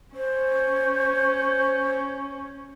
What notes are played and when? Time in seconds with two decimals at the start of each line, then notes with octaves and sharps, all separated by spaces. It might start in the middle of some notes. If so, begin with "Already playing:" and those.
0.15 C#4 C5